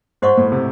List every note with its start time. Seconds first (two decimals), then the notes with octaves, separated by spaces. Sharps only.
0.22 G#2 F#4 C5 D#5 F#5 C#6
0.37 A2
0.52 C3